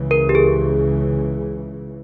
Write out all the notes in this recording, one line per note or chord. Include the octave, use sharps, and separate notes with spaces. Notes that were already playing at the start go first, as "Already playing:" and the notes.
Already playing: C#2 C#3 E3
A#4
G4
G#4